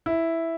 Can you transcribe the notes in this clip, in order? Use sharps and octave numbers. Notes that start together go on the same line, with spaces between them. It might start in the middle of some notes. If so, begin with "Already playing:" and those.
E4